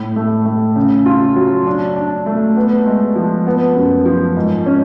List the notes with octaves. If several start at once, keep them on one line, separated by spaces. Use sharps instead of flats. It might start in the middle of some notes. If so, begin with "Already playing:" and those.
Already playing: A2
A3
A3
C#3
F4
F#3
D4
D4
A3
B3
G#3
F3
B3
F#2
F3
G#2
C#4